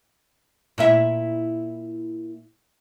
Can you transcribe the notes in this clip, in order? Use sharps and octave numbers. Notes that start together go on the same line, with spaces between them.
A#2 E4 E5